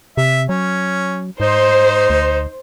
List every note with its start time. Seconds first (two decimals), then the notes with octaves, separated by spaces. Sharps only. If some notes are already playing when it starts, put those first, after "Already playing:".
0.17 C3 E5
0.49 F#3 C#4
1.40 G#2 D#4 C5
2.10 D2